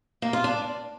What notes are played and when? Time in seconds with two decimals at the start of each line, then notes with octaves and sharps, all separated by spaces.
0.22 A#3
0.33 F4
0.44 D4